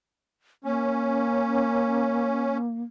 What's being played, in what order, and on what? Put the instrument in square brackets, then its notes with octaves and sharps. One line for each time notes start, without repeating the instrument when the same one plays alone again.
[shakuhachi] A#3 [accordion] C#4